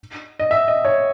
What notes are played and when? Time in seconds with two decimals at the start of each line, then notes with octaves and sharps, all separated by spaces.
0.40 D#5
0.51 E5
0.68 D#5
0.85 C#5